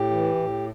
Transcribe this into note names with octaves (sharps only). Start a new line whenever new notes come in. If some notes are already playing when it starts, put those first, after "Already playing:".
Already playing: A2 G4
E3
A2